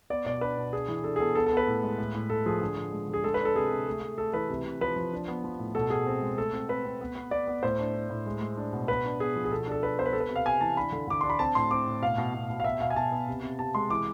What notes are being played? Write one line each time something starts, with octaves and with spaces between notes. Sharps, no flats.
B3 D5
B2 D5
D4 B4
B2
D4 G#4
E3
D4 A4
G#4
B3 A4
B3 A4
A4
B3
B4
A2
G#3
A2
A2
A2 A4
F3 G#4
D3
F3
G#3
D3
G#4
G#3 A4
B4
D4
A4
C3 G#4
C3
A3
A3
A3 A4
E3 B4
C3
C3
F3 B4
F3
D4
B3
F3
A2
B2 A4
B2 G#4
C4
G#3
A3 A4
C4
C4 B4
C4
B3
B3
B3 D5
B3
A2 C5
D4
D4
A2
G#3
G#3
D4
B2
B3 B4
D4
B3 G#4
F3
G#4
B2 A4
D4 A4
D4 B4
B3 C5
B4
B3 A4
B4
C3
F5
C3 G#5
E3 A5
D4 B5
D3
D3 D6
D4 C6
B5
C4 A5
A2 C6
C4 D6
A2
B2 F5
B2
B2
B2
F5
B3 E5
B2 F5
G#5
B2 A5
B3
C3
C3
C3 A5
G#3 C6
E3 D6